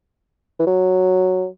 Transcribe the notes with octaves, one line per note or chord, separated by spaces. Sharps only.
E3
F#3